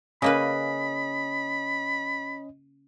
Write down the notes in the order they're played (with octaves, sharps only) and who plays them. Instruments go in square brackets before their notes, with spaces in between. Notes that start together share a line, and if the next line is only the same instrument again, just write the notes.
[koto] C#3 A#3 B4 [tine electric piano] C#4 D#5 [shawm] B5